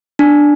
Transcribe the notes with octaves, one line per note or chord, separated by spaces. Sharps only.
D4